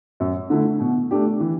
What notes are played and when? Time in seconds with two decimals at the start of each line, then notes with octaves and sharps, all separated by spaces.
0.20 F#2
0.50 D3 A3 E4
0.80 B2
1.11 A3 D4 G4
1.40 E3